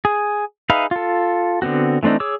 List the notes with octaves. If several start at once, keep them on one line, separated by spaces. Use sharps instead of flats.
G#4
D#4 G#4 B4 E5 F5
F4 A4
D3 B3 C4 F#4
E3 A3 C4 D4 D#4
G#4 C#5 D6 E6